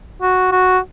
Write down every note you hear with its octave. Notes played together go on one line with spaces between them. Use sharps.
F#4
F#4